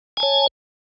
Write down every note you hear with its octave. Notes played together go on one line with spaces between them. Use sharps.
C#5 G#5 A5